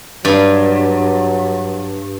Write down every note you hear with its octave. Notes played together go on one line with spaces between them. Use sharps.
G2 F#3